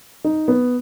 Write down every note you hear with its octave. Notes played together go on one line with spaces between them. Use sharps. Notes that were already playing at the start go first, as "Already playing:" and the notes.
D#4
B3